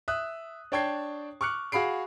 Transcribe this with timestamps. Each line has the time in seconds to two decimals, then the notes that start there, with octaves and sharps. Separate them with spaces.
0.08 E5 D#6 F#6
0.72 D4 C#5 G5 A5 G#6 C7
1.41 C#6 D6 F6 F#6 C#7
1.72 F#4 G#4 F5 B5 C7 D7